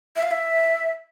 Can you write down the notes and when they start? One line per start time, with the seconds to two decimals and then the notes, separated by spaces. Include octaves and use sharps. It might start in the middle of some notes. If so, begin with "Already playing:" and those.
0.16 E5
0.23 F5
0.31 E5